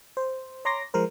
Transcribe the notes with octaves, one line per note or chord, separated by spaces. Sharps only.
C5
C#5 A#5 C6 D6 A#6
F3 G#3 A#4 C5